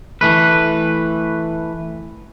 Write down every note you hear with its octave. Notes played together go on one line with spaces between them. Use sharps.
E3 A3 B4